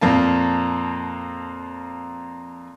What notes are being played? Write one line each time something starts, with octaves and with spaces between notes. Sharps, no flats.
F2 A#2 A#3 A5